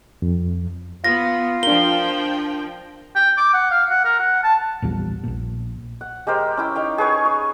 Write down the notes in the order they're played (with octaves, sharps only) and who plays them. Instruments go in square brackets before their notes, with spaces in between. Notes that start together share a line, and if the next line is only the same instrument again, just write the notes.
[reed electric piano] F2
[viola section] B3 [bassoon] F4 [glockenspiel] A#6
[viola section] F3 G5 [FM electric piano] D4 A#4 [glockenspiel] G7
[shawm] G5
D6
F#5
F5
F#5
A#4
F#5
A5
[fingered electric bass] A#1 E2 A#2 G3
A#1 A#2
[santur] F#5
G#3 G4 A#4 C5
C#4 E4 G5
D#4 F5 G5
G#4 B4 C#5 C#6
C#5